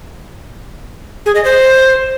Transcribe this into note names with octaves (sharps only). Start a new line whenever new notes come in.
G#4
D#5
C5